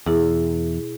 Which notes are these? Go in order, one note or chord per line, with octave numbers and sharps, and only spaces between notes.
E2 B2 E4 G#4